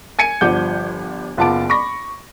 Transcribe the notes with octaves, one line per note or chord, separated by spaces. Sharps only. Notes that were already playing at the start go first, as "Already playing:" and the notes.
G#5 G#6 C#7 D#7
G1 F3 G3 F#5 D6 G6
F#1 B3 F4 A5 D6 D7
B5 C#6 D6 A#6